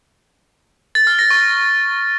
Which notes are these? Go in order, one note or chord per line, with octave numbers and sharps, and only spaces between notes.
A6
F6
A#6
C#6
A#6